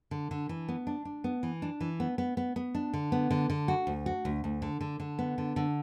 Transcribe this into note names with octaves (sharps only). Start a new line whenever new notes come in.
D3
D3
E3
B3
D4
D4
B3
E3
D4
E3
B3
B3
B3
B3
D4
D3
B3
D3
D3
F#4
D2
F#4
D2
D2
D3
D3
D3
B3
D3
D3